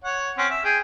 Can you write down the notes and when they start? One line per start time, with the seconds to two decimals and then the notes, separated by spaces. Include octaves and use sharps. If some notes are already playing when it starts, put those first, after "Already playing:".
0.04 C#5 F#5
0.38 C4 C#4 F#5
0.50 E5
0.64 G#4 G5